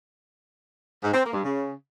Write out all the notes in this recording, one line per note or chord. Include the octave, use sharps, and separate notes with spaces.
G#2
C4
A#3
G2
C#3